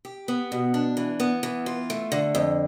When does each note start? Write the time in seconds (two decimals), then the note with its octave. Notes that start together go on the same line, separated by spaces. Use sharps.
0.05 G4
0.28 B3
0.52 B2
0.74 D4
0.97 E3
1.20 B3
1.43 E3
1.66 F4
1.90 A3
2.12 D3
2.35 F2